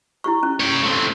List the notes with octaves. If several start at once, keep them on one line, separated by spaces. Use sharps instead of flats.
E4 G4 C#6
C#4
C#5 G5
A3 C4